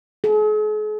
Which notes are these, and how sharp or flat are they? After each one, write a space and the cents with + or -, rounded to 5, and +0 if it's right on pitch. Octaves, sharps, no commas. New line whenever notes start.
G#4 +45